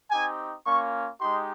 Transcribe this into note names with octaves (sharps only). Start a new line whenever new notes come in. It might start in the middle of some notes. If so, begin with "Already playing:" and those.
C4 D#4 G4 G#5
A#3 C#4 F4 C#6
G#3 D#4 G4 C6